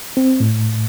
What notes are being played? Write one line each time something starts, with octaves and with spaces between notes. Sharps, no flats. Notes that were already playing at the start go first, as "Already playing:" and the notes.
C4
A2